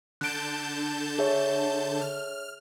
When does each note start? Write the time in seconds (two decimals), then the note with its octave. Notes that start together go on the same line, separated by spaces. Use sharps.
0.21 D3 A5 F#6 G6 D7
1.19 G#4 C#5 E5
2.01 F6